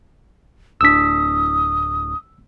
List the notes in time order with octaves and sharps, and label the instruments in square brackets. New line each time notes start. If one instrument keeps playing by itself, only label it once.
[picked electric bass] D1 D4 [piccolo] D#6 [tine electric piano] E6 B6